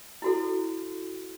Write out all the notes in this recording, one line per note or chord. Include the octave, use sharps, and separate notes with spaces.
E4 F#4 A4